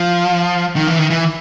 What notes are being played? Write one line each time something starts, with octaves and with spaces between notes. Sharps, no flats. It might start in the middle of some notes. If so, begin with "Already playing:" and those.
Already playing: F3
D#3
E3
D#3
E3